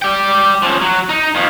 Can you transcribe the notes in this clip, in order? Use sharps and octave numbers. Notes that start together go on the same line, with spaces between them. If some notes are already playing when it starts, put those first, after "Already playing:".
D5 G5
F3 C#4
F#3
D#4
F2 D#3